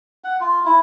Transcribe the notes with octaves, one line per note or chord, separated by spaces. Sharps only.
F#5
F4
E4